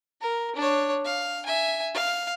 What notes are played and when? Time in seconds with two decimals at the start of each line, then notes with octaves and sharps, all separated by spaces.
0.21 A#4
0.56 D4 C#5
1.05 F5
1.46 E5 G#5
1.94 F5